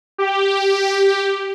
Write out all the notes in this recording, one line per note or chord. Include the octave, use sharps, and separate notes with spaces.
G4